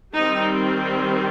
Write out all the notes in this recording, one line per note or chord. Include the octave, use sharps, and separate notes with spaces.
D#3 G3 C4 D#4